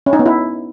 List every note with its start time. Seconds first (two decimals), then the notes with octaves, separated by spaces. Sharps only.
0.06 C#4
0.13 D#4
0.19 B3
0.26 E4